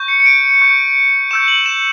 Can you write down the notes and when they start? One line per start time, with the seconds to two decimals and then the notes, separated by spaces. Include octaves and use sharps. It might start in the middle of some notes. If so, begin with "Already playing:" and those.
Already playing: C#6 G6
0.08 C#7
0.20 C#7
0.26 D7
0.61 C#6 G6
1.31 C#6 E6 G6 E7
1.48 F#7
1.66 E7